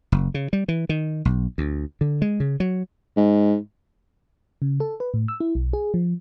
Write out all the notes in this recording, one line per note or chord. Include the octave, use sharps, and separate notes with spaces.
F#1
C#3
G3
E3
D#3
B1
D2
D3
G#3
C#3
F#3
G#2
C#3
A4
B4
A2
E6
E4
B1
G#4
F3